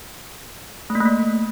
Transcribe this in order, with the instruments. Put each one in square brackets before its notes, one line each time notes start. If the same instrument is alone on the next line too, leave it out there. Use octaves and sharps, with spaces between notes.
[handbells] A3
A#3
A3
A#3